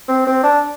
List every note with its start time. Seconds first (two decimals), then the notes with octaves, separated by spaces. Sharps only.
0.09 C4
0.27 C4
0.44 D4